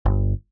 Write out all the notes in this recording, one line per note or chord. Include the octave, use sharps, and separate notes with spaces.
G1